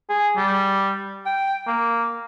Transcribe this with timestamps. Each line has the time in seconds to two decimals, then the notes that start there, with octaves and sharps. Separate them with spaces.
0.10 G#4
0.36 G3
1.26 G5
1.67 A#3